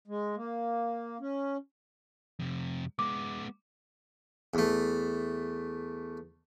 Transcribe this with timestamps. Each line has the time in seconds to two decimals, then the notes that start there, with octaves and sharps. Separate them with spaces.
0.08 G#3
0.36 A#3
1.20 C#4
2.39 F2 C3
2.99 G#3 B3 D6
4.54 E2 A3